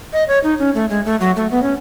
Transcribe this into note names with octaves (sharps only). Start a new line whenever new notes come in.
D#5
C#5
D#4
C#4
A3
G#3
A3
F#3
A3
B3
C#4